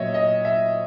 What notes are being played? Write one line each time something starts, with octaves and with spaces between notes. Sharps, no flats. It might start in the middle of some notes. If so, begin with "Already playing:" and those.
Already playing: A#2 F#3 C#5 D#5 E5
D#5
E5